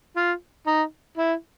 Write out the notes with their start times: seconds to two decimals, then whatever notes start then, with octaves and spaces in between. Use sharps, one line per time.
0.16 F4
0.67 D#4
1.17 E4